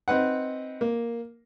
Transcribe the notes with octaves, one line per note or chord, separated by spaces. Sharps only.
C4 D#4 B4 F#5
A#3